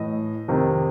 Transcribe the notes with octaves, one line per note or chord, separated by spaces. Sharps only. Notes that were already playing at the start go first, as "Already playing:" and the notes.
Already playing: A2 E3 D#5
F2 C3 D#3